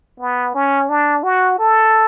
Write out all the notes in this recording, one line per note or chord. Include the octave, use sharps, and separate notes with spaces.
B3
C#4
D4
F#4
A4